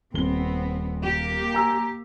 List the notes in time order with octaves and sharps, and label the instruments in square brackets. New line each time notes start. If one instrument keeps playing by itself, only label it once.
[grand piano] D#1 G7 [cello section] B3 C4
[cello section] A#3 G4
[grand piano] G#5 A#5 E6